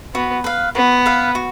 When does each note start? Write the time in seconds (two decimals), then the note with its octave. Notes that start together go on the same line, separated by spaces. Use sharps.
0.15 B3 F#4
0.44 B4 F5
0.75 B3 F#4
1.06 B4 F5
1.35 F#4